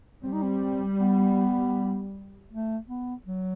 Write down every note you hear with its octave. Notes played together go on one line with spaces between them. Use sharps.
G3 C4
D#4
C4
B3
A3
B3
F#3